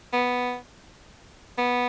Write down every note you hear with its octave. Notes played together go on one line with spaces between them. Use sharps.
B3
B3